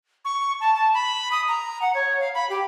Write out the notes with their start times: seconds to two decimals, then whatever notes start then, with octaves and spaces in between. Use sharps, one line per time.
0.25 C#6
0.60 A5
0.75 A5
0.94 B5
1.31 D#6
1.48 A#5
1.82 F#5
1.95 C#5
2.20 F5
2.34 B5
2.50 G4